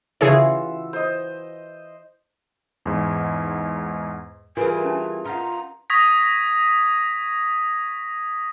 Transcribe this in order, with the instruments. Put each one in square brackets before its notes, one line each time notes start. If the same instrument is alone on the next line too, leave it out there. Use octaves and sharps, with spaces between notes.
[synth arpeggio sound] C#3 G#4 C#5 [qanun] E3 F4 F#4 [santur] E5
[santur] C5 D#5
[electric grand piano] E2 G#2
[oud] E3 G3 [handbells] F4 G#4 [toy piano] A#4 B4 [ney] G#5
[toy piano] C#4 G5 A5
[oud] F4 [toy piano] F5 F#5 [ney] A#5
[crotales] C#6 D#6 G#6 A#6 B6